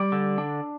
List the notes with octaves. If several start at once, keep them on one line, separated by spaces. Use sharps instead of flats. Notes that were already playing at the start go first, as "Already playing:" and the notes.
Already playing: G3 D5
D3
D4